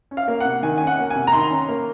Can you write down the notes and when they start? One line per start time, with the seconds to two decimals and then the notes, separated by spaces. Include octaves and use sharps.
0.11 C#4
0.17 F5
0.28 A#3
0.40 F#5
0.45 C3
0.63 D#3 G#5
0.78 C#4 G#5
0.87 F#5
0.99 A#3
1.10 G#5
1.16 C3
1.27 A#5
1.33 D#3 C6
1.51 C#4
1.69 A#3